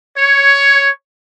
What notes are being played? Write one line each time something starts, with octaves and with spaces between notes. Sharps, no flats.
C#5